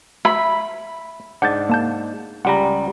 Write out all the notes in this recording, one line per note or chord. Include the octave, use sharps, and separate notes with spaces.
E5 B5
G#2 D4 F#5 G6 A6
A#3 A5 G6
C#2 G3 F#5 A#5 B5